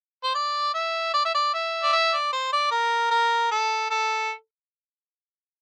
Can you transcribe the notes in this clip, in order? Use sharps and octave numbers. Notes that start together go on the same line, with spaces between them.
C5
D5
E5
D5
E5
D5
E5
D5
E5
D5
C5
D5
A#4
A#4
A4
A4